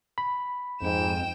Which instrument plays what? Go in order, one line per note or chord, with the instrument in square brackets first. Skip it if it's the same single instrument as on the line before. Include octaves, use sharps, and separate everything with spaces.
[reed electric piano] B5
[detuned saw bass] F2 [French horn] G#2 [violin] G5 E7